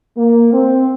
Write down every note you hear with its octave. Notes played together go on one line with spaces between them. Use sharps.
A#3
C4